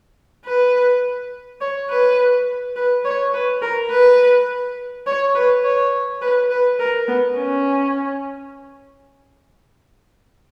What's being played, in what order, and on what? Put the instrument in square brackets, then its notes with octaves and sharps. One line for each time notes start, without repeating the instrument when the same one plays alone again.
[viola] B4
C#5
B4
B4
C#5
B4
A#4
B4
C#5
B4
C#5
B4
B4
A#4
B3
C#4